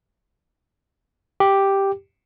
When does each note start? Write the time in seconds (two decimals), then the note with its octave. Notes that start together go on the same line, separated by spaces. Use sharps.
1.40 G4